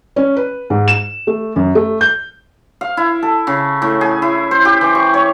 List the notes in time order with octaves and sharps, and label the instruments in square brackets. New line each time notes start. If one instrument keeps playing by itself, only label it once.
[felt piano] C#4
B4
G#2
E7
A3
F#2
A3
G6
[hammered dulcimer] F5
E4
A4
C#3
A2
G#4
E4
C5
G4
E3
C#6
C#5